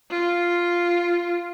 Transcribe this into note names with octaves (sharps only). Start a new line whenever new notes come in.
F4